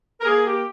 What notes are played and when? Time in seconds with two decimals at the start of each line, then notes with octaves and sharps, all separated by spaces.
0.20 A#4
0.24 A#3 G#4
0.44 G4